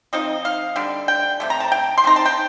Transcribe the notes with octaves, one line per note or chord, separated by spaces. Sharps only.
F3 C4 D#4 D#5
F5
D3 G3 D4
G5
C3 D#3 A3
A#5
A5
G5
C6
G3 C4 D#4 A#5
A5
G5